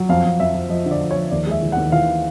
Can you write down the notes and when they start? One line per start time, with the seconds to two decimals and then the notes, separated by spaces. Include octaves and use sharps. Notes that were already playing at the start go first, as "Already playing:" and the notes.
Already playing: F#3
0.09 F2 F5
0.24 F2
0.40 F2 E5
0.55 F3
0.70 F3 D#5
0.86 D3
0.91 D5
1.01 F3
1.11 C#5
1.16 F3
1.31 D#2 D5
1.47 G#3 E5
1.62 E3
1.72 F#5
1.77 D#2
1.92 E3 F5